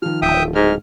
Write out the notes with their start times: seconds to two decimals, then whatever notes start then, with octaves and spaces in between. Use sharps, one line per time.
0.02 D#3 F3 F6
0.22 D1 E5 G5 D#6
0.55 G#2 F6